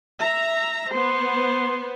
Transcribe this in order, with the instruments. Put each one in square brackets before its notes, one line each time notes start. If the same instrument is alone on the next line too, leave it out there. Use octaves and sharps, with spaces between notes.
[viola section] E5 A#5
[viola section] B3 C5 [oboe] C6